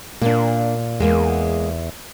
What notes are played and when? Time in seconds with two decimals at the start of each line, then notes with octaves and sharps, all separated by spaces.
0.22 A#2 A#3 D4
1.00 E2 G#3 A#3